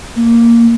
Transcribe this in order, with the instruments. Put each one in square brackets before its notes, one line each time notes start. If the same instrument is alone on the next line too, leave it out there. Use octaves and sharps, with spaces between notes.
[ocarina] A#3